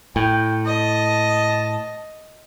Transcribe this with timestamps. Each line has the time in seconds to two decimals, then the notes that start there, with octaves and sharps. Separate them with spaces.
0.16 A2 G5
0.66 D#5 A5